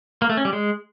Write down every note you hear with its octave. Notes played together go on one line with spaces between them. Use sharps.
A#3
A3
C#4
G3
G#3